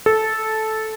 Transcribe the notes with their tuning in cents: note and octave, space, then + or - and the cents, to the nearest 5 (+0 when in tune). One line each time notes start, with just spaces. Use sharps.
A4 -10